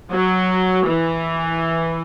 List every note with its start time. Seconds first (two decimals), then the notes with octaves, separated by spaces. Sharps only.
0.11 F#3
0.88 E3